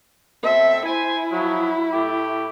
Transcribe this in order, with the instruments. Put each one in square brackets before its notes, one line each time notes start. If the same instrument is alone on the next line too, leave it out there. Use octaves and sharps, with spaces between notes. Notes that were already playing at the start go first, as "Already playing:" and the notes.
[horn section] B2 C4 A4 [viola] E5
[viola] E4 [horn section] C5 G#5
[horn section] F3 F#3
A2 A3 G4